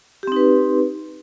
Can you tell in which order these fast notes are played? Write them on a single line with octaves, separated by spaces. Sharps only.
G4 C4 D#4 B4